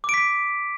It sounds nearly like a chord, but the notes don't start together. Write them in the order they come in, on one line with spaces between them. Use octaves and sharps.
D6 D7 B6